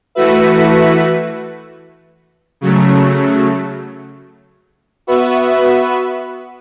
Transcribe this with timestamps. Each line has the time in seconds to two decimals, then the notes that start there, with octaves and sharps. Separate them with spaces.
0.15 E3 A3 F#4 B4 E5
2.61 C#3 F#3 A3
5.07 B3 F#4 B4 E5